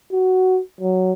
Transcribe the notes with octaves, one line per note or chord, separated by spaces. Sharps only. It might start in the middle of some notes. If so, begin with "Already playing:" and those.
F#4
F#3